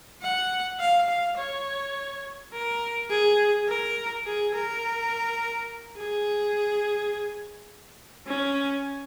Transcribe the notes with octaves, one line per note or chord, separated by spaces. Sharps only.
F#5
F5
F5
C#5
A#4
G#4
A#4
G#4
A#4
G#4
C#4